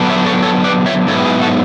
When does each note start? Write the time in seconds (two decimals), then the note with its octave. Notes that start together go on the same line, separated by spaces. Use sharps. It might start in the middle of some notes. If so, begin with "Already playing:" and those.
Already playing: D3 F#3 B3 D4
0.09 C#5 E5
0.26 A4 C#5
0.42 A4 C#5
0.64 B4 D5
0.86 C#5 E5
1.08 G#2 F#3 B3 E4 A4 C#5
1.25 G#4
1.41 F#4 A4